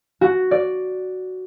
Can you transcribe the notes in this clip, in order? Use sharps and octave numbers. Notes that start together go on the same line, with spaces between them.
F#4
D5